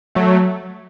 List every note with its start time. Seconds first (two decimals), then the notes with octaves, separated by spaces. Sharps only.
0.15 F#3 A3